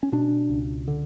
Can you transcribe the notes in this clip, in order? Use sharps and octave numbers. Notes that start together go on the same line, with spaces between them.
C#4
B2 D4
C#2
D3